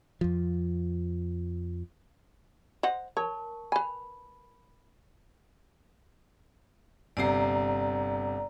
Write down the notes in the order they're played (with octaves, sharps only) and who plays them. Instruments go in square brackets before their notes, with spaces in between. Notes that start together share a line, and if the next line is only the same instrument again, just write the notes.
[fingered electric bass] F2 F3
[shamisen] C5 D#5 F#5
[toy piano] A#4 A5 C#6 [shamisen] C#5
[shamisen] B4 G#5 [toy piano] B5
[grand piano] G1 C3 C7 [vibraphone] D5 A#5